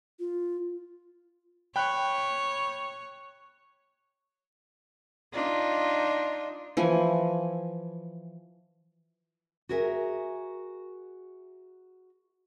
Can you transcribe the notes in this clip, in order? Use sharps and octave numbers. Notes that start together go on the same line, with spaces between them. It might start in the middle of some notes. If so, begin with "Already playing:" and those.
F4
C#5 G5 B5 F#6
D4 D#4 F4
E3 F3 G#5
F#4 G#4 A#4 E5 F5 G#5